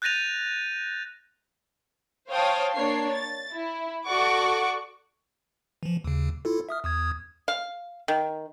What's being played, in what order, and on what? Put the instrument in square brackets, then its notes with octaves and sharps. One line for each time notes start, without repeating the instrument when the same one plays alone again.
[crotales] F#6 G6 A6 A#6 D#7 F7
[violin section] C5 C#5 F5 G5 A5 D#6
A#3 D4 C#5 C7
A6
E4
F#4 A4 D5 F#5 C#6 D6
[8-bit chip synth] E3 F3
D#2 C#3
E4 F4 A4
E5 D#6 F6
E2 D#6 G#6
[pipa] F5
D#3